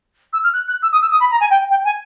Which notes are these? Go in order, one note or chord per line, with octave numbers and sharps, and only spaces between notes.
E6
F6
F#6
F#6
E6
D#6
E6
D#6
B5
A#5
G#5
G5
G5
G#5